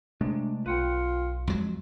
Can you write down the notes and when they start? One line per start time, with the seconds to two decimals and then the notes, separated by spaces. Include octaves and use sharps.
0.21 C3 G#3 A3 D4
0.66 B1 F4 B4 F#5 G5
1.47 F2 F#3 G#3